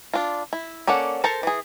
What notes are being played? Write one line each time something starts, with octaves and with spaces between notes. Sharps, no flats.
D4 F4
E4
A#3 C#4 A4 D5 F#5
A4 A#4 C5 A5
E3 G#4